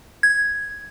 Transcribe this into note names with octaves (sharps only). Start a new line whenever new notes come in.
G#6